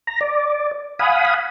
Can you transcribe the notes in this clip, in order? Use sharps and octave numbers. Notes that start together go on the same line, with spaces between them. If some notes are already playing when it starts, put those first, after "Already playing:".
A#5
D5
F5 F#5 G#5 B5 D#6